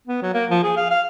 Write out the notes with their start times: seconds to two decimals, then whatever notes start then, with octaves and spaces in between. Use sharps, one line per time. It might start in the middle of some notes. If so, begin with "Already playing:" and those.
0.07 B3
0.22 F#3
0.34 A#3
0.50 F3
0.63 G#4
0.77 F5
0.91 F5